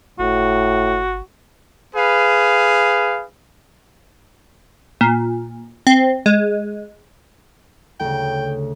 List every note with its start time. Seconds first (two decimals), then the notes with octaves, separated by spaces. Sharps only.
0.19 G1 A2 F#4
1.94 G#4 B4 F5
5.01 A#2
5.87 C4
6.26 G#3
8.00 D2 C#3 G5